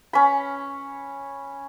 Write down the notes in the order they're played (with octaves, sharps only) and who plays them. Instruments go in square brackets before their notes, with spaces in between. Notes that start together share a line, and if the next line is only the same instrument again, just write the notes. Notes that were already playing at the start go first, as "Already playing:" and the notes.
[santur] C#4 B5